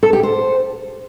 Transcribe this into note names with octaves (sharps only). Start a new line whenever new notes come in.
A4
G4
C5